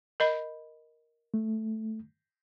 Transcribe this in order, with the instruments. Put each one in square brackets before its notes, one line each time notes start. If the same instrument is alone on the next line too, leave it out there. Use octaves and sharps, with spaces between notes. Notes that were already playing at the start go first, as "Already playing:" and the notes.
[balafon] A#4 D#5 B5
[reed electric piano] A3